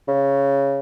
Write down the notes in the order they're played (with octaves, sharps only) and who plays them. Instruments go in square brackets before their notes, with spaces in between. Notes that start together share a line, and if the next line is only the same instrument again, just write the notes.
[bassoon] C#3